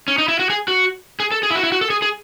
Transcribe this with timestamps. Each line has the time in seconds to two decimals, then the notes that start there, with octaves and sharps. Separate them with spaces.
0.08 C#4
0.18 D#4
0.28 E4
0.39 F#4
0.50 G#4
0.68 F#4
1.20 G#4
1.32 A4
1.43 G#4
1.50 E4
1.55 F#4
1.63 E4
1.72 F#4
1.81 A4
1.90 G#4
2.02 G#4